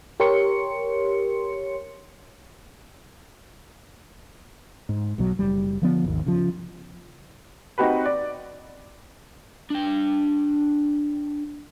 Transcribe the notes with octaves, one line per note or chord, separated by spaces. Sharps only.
G4 A#4 C#5 C6 C#7
G#2
B1 B2 F#3
F#1 G3
D3 F3 B3
G#1 D#2
C#3 F3
C4 D#4 F#4 G4 B4
D5
D4 G5